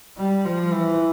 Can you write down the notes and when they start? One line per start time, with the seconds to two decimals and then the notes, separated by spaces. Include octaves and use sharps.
0.17 G3
0.45 F3
0.73 E3